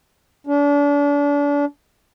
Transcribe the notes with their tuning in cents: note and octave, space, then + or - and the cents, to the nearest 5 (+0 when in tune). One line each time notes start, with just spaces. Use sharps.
D4 -35